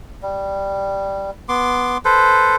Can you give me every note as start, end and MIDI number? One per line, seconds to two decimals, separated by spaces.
0.22 1.31 55
1.49 1.97 59
1.49 1.97 84
1.49 1.97 86
2.05 2.56 69
2.05 2.56 71
2.05 2.56 72